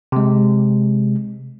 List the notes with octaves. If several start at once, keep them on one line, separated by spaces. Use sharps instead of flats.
C3 G#3